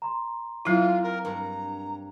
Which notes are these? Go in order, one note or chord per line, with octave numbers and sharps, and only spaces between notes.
A#5 C6
F#3 A#3 C4 E4 F4 F#5
A#4
G2 A#4 A#5